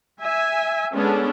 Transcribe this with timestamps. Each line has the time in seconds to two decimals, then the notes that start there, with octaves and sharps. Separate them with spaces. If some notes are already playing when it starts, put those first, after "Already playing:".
0.21 E5 G#5
0.94 G#3 B3 C#4 D4 A4